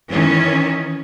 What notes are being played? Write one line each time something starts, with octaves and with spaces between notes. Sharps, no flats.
D#3 E3 C#4